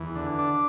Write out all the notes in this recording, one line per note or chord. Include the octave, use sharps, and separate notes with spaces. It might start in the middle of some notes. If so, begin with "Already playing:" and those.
Already playing: E2
D3
D4